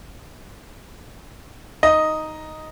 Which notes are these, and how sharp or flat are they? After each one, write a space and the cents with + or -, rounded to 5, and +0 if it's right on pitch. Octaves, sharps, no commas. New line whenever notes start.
D#4 +5 D#5 +0